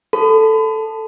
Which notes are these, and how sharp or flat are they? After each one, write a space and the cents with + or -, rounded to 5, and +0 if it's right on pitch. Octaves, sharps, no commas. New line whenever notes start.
A4 +0 B5 +40